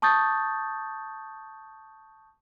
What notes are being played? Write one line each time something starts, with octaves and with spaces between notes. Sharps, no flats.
A5 C#6 D#6 G6 A6